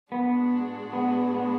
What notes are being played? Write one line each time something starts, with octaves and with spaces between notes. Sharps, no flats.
A2 G#3 B3 D4 F#4
B3
B3